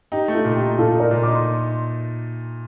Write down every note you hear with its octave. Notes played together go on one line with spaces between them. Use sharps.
D#4 G4
A3
F4 A4
A#2
G4
D#4
A#2 F4 A4
D#4
A#4 D5
A#2
D#4 D6
C6